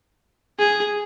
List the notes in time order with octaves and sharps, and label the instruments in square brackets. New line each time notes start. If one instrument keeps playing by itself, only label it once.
[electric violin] G#4